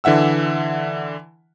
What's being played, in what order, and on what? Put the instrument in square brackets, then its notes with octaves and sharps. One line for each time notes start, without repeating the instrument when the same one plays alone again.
[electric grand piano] D3 E3 E5 F#5 E6